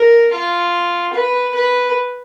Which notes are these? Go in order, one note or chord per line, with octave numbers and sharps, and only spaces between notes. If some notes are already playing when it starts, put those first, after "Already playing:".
Already playing: A#4
F4
B4
B4